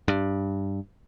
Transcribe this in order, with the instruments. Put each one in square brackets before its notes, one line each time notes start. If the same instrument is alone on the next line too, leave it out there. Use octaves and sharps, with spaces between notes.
[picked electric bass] G2